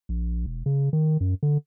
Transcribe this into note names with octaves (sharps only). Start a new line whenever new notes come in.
A#1
E1
C#3
D#3
F#2
D3